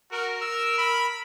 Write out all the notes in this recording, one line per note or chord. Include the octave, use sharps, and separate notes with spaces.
F#4 A#4
E6
B5